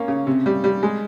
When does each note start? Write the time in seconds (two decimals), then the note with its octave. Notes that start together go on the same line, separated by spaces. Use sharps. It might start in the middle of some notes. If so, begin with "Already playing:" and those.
Already playing: A#3 C#4
0.08 C#3
0.27 C3
0.46 G3
0.64 G3
0.83 G#3